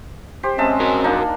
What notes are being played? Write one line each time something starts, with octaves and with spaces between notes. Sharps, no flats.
G4 C5
G#3 C4 C#4 D#5 E5 A5
F#4 A#4
A#3 D4 D#4